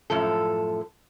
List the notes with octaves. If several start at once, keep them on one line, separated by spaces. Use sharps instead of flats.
F#2 A2 F3 A4